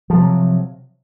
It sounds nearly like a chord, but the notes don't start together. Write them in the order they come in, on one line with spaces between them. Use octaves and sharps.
F3 C3 F#3